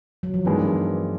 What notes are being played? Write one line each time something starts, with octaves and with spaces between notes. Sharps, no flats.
F#3
F3
G2 D#3 E3 G#3 B3 D4